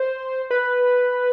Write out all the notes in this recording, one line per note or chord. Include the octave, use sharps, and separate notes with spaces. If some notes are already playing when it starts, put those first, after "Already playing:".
Already playing: C5
B4